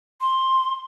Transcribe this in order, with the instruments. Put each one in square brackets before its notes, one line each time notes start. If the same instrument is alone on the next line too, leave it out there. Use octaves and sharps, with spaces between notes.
[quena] C6